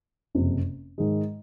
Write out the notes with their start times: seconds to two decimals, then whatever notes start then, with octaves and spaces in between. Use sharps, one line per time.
0.35 F#1 F2 C3
0.98 G#2 D#3 G#3